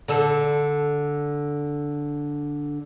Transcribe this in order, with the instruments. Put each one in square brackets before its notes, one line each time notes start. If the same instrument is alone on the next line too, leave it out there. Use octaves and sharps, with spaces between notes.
[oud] D3 A4